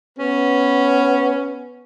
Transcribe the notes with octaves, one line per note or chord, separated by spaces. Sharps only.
B3 C#4